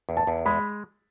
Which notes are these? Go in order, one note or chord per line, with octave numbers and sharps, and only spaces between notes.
E2
A5
E2
G#3 B5